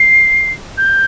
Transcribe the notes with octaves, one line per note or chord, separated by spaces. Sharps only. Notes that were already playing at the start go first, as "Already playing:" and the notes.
Already playing: C7
G6